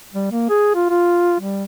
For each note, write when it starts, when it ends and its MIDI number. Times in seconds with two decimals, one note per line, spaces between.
0.13 0.27 55
0.31 0.47 58
0.49 0.72 68
0.75 0.86 65
0.90 1.37 65
1.40 1.64 55